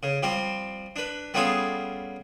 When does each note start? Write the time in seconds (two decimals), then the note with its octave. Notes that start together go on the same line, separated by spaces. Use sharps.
0.03 C#3
0.23 F3 G3 C4 G4
0.96 D4 B4
1.34 G3 B3 C#4 F4 G#4 A4